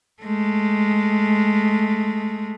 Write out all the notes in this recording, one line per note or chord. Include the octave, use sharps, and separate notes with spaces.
G#3 A3